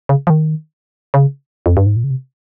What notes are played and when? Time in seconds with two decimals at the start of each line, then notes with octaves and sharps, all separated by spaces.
0.09 C#3
0.27 F3
0.30 D#3
1.14 C#3
1.66 F2
1.77 G2
1.86 G#2
1.96 A#2
2.04 C#3
2.10 C3